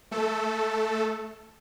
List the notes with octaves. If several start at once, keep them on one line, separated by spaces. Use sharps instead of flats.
A3 A4